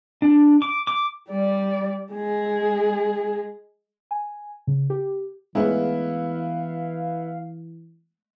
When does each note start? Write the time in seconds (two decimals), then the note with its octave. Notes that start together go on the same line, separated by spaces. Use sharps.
0.22 D4
0.62 D6
0.87 D6
1.29 G3 D5
2.13 G#3 G#4
4.11 G#5
4.67 C#3
4.90 G4
5.55 E3 G#3 A3 B3 C#4 E4 F5